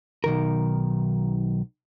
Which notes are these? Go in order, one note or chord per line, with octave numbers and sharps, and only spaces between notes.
B1 D#3 A#4